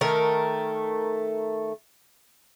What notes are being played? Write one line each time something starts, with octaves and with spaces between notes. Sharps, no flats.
D#3 A3 A#4